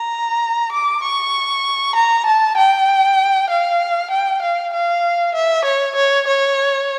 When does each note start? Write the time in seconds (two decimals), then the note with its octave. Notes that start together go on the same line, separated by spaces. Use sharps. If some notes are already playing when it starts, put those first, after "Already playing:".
Already playing: A#5
0.72 D6
1.03 C#6
1.96 A#5
2.26 A5
2.57 G5
3.50 F5
4.11 G5
4.42 F5
4.73 F5
5.35 E5
5.65 C#5
5.96 C#5
6.27 C#5